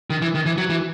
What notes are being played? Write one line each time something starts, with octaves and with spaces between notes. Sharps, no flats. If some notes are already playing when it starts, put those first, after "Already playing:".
D#3
E3
D#3
E3
F#3
E3